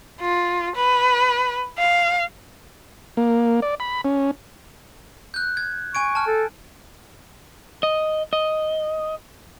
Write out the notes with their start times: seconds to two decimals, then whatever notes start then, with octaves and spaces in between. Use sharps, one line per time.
0.21 F4
0.75 B4
1.78 F5
3.17 A#3
3.62 D5
3.80 B5
4.05 C#4
5.34 F#6 G6
5.57 G#6
5.95 G#5 C#6 G#6 D7
6.15 A5 F6
6.27 A4
7.83 D#5
8.33 D#5